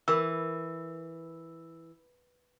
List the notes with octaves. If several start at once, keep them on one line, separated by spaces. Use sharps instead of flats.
E3 A#4 E6